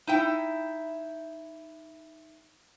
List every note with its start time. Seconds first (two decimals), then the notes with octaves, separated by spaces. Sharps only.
0.07 D#4 E4 G5